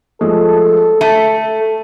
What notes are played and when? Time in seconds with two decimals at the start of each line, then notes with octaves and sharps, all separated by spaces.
0.21 F3 G#3 A3 A4
1.01 A3 A5 D#7